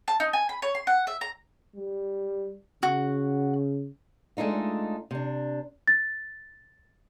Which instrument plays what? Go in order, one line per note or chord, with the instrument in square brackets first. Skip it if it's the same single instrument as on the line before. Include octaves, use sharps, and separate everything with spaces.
[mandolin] A5
D#4
G#5
B5
C#5
C6
F#5
E5
A#5
[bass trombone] G3
[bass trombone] C#3 [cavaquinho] F#4
[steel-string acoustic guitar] G#3 A3 D4 D#4 F4
C3 D4
[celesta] A6